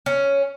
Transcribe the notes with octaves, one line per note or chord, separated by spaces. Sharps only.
C#4